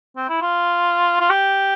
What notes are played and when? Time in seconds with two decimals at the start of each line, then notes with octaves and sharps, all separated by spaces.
0.16 C4
0.29 E4
0.41 F4
1.20 F4
1.30 G4